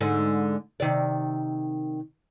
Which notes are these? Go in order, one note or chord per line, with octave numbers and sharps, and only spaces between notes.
G#2 D3
C3 D#3 D5